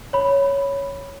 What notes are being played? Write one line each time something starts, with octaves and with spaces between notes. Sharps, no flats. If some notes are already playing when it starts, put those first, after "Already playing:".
C#5 B5